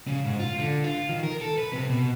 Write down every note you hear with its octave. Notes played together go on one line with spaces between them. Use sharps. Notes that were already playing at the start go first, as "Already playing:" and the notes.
C#3
G#2
F4
D3
F4
D#3
A#4
A4
B4
C3
B2